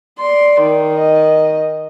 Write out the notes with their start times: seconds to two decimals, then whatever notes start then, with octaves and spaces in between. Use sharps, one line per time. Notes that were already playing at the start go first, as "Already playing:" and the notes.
0.19 D5 C6
0.61 D#3
0.95 D#5